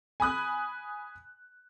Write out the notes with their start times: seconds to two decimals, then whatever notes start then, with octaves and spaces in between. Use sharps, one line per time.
0.20 G#5 B5 D#6 F#6